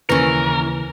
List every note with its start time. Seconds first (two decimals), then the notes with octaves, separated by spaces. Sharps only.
0.09 D#2 C#3 E3 C#4 A#4